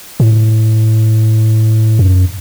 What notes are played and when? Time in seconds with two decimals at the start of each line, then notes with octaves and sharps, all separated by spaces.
0.20 A2
1.99 F#2